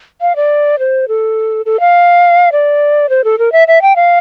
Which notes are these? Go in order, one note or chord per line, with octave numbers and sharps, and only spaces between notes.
F5
D5
C5
A4
A4
F5
D5
C5
A4
A#4
E5
E5
G5
F5